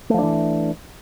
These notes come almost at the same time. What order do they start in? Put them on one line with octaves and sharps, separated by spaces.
A3 F3 D4 E3